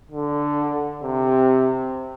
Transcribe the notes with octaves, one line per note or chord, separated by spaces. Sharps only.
D3
C3